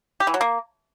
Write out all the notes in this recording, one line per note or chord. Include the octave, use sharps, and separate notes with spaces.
G4
E3
F#3
A#3